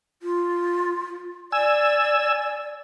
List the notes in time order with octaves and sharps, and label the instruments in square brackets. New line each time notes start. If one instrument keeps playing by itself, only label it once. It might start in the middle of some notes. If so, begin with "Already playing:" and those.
[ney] F4
[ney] D5 [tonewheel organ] G#5 E6